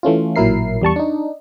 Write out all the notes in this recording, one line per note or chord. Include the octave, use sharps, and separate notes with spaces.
E3 A3 C#4 F4
A1 A#2 F#3 E4 A#4 C7
E2 G3 A5 C#6
D4 D#4